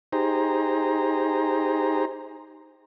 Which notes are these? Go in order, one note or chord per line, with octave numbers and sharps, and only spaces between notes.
D#4 G4 G#4 C5 A#5